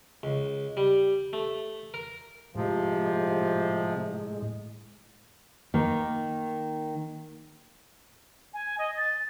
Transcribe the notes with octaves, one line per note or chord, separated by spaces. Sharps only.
C#2
G3
A3
A#4
A2 C3 F3 G#3
D#3 A#3
G#5
D#5
A6